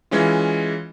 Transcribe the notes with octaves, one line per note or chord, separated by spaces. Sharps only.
E3 G#3 C#4 F4